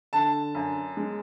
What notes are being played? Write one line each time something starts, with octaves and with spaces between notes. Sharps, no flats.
D3 A5
F#2
G#3